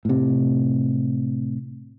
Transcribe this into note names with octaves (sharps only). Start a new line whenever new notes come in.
A2 C3